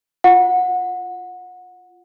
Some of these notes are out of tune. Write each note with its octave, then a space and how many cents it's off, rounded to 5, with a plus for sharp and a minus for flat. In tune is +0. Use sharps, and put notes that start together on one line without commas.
F4 +0 F#5 -25